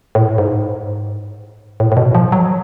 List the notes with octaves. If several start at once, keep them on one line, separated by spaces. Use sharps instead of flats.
A2
G#2
A2
A2
B2
F3
F#3